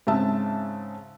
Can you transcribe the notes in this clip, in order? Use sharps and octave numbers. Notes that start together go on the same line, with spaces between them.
G#2 C#3 C4 E5 A5 E6